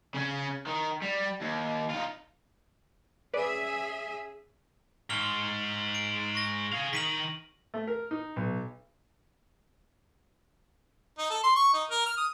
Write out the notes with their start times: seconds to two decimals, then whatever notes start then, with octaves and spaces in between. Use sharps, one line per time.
0.14 C#3 C#4
0.66 D#3
1.02 G3
1.41 D#2
1.90 D#4 F4
3.34 C#4 G#4 B4 D5 E5
5.10 G#2 C#6 F6 G7
5.95 D7
6.35 C#6 A#6
6.72 G#4 F5
6.93 D#3 B6 D#7 F#7
7.74 A3
7.88 A#4
8.11 D#4
8.36 B1
11.18 D#4
11.30 A4
11.44 C6
11.56 C#6
11.74 D#4
11.90 A#4
12.06 F6
12.17 D#6